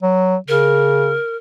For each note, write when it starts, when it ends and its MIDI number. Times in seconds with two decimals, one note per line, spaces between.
0.03 0.36 54
0.48 1.16 49
0.48 1.36 70